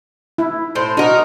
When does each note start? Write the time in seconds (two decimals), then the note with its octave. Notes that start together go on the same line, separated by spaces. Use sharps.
0.38 E4
0.75 A2 C5
0.97 D4 D#4 F#4 A#4